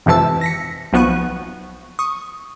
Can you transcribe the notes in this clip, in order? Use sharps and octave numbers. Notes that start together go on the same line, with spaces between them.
G#1 F2 C3 E3 A5 E6
A#6 B6 C#7
B1 F3 B3 C#6 F#6 D#7
C#6 D#6